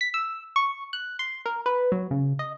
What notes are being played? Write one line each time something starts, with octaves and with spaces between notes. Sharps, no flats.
B6
E6
C#6
F#6
C6
A#4
B4
F#3
C#3
D#5